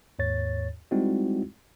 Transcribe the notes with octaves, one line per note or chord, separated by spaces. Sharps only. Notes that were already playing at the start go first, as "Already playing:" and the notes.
D#2 G#2 C#5 A6
G3 G#3 C4 D#4 E4 F#4